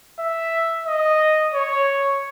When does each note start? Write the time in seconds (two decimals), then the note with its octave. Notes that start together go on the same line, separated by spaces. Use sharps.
0.20 E5
0.87 D#5
1.55 C#5